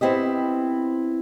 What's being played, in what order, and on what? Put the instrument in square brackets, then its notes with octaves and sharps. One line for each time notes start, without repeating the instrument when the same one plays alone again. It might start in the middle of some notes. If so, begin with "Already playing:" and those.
[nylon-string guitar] B3 C4 E4 G4 D#5